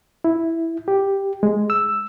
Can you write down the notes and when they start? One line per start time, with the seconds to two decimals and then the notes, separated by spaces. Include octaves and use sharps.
0.24 E4
0.88 G4
1.43 G#3
1.70 E6